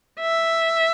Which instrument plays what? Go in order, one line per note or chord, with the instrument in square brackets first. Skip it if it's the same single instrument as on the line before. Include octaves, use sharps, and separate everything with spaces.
[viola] E5